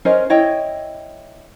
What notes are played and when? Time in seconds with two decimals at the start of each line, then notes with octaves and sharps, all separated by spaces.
0.05 C#4 A#4 C5 D#5
0.30 E4 C#5 D#5 G5